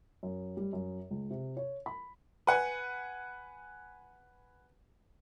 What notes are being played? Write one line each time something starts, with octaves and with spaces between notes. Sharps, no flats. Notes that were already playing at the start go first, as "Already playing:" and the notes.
F#2
G3
F#2
C#2
C3
C#5
B5
B4 F#5 G#5